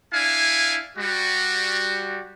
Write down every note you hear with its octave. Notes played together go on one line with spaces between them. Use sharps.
D4 E4 F5 G#5
G3 F#4